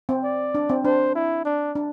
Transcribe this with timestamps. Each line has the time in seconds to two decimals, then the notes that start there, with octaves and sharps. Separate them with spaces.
0.09 C4
0.24 D5
0.55 D4
0.70 C4
0.84 D4 C5
1.15 E4
1.45 D4
1.75 D4